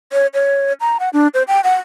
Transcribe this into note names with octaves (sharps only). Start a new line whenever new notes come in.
C#5
C#5
A#5
F#5
D4
C5
G5
F#5